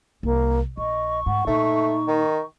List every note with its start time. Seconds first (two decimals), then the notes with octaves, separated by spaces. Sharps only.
0.23 C2 A#3
0.77 A#1 D#5 C#6
1.26 G#2 F#5
1.47 A#2 A3 D#4
2.08 D#3